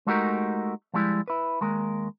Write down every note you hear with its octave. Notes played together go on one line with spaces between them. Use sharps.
G#3 A3 D#4 F#4 G4 A#4
F3 G3 G#3 E4
E4 B4
D#2 G#3 A#4